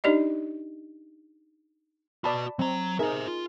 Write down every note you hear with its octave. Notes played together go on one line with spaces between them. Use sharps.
D4 D#4 G4 D5 D#5
F#4 B4 D5 A5 B5
F#3 C4 A#5
D#4 G#4 A#4 C5 E5
F4